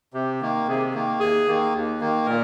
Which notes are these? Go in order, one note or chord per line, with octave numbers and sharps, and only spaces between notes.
C3 G4
D#3 A#3
C3 G#4
D#3 A#3
D#2 G#4
D#3 A#3
D#2
D#3 A#3
A#2 A#4